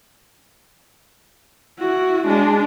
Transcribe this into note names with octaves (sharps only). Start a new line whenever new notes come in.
E4 F#4
G#3 D4